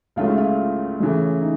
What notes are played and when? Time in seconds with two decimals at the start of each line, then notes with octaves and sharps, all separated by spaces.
0.16 C#2 C#3 F#3 A3 F4
0.28 E4
0.38 F4
1.00 F#2 C#3 E3 A3
1.41 D#4